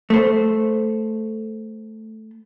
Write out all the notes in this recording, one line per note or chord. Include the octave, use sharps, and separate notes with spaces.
A3 C5